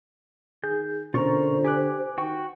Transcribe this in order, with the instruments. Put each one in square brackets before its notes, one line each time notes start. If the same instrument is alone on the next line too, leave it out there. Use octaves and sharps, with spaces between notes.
[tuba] D#3 [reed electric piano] G#4 [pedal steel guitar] G6
[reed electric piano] B2 C#4 C#6 [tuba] D3 [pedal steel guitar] F4 A#4 A#5 [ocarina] C5
[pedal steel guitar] G4 [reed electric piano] G#5 D6 F#6
[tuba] D#3 [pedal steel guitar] F#4 G5 C#6